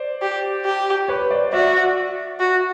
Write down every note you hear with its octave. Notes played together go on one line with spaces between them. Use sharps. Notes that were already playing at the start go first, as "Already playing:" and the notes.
Already playing: C5 D5
G4
G4
B4 C#5
C5 D5
F#4 D5 E5
F#4